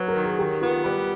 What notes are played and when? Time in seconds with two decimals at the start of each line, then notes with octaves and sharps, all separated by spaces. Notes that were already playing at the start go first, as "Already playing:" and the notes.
Already playing: F#3 B4
0.08 A#4
0.16 D#3
0.24 G#4
0.38 D#3 G4
0.61 B3 F4
0.84 G3 B4